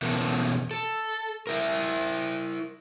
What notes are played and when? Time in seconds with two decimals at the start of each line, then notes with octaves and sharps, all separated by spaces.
0.02 B2 E3 B3 C#4 A4 A#4
0.71 A4
1.47 E4 A#4